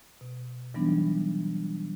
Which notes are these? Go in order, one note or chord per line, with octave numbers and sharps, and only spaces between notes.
B2
E3 F#3 G3 B3 D4 D#4